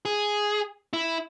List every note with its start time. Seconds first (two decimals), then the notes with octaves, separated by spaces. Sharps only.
0.05 G#4
0.93 E4